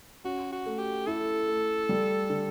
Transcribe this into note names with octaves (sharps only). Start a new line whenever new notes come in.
C#4 F#4
F#4
A3
G4
E4 A4
A3
G3
D3